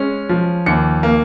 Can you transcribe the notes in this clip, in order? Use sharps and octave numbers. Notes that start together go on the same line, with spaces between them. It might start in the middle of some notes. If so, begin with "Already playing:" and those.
Already playing: G#3 C#4
F3
D#2 C#7
A#3